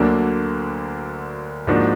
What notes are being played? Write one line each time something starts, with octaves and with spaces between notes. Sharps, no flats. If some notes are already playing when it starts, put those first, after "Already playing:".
Already playing: D2 D3 F#3 A#3 D4
G#2 F3 A#3 D4 F#4